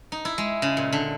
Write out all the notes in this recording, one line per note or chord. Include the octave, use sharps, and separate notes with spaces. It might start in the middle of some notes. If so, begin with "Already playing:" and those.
D#4
E4
G#3
C#3
A#2
D3